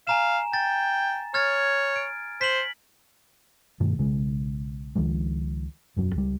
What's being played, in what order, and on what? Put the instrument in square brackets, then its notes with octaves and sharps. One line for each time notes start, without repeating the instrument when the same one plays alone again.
[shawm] F5 [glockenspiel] G#5 A#5 E7
[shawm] G5 [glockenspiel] A6
[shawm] C#5 [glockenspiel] F6 G#6 A6
[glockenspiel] D7
[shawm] C5 [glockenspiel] B6 F#7
[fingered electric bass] G2 B2 D#3 A3
B1 C#3 G#3
C#2 D#3 F3 G#3
E1 F#2 F#3
C#2 G3